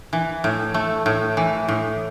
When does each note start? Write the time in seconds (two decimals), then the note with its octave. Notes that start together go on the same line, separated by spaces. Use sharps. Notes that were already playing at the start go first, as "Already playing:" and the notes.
0.13 E3
0.44 A2
0.74 A3
1.06 A2
1.37 E3
1.68 A2